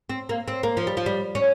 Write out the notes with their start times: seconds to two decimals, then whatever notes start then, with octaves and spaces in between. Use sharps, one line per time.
0.10 C4
0.29 A#3
0.48 C4
0.63 A#3
0.77 F3
0.87 G3
0.97 F3
1.06 G3
1.35 C#4